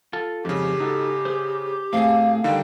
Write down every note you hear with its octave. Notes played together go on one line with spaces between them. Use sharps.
F4 A4
F2 G#2 C#3 G4
D#4 F#4 A4
G#4 C5
A2 A3 C4 G#4 F5
D3 D#3 G3 D#4 G5